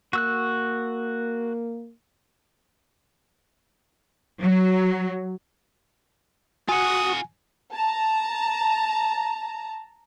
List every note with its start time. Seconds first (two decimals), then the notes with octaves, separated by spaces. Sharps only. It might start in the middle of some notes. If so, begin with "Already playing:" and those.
0.13 A#3 F#4 E6 F#6
4.42 F#3
6.69 F4 F#4 F#5 G#5 D#6
7.73 A5 A#5